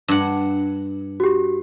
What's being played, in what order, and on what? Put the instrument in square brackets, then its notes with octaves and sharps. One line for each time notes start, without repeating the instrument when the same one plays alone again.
[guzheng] G2 F#5
[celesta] F#4 G4